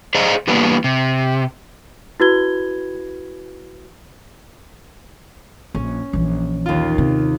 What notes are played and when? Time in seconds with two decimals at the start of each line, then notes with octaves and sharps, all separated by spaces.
0.15 G#4 C5 D5 D#5 F5 A#5
0.48 E3 G3 A#3 B3 D4
0.84 C3
2.20 E4 F#4 B4 B5 G#6 G7
5.75 A#1 C#4
6.13 A#1 E3
6.66 D#2 F4
6.98 C3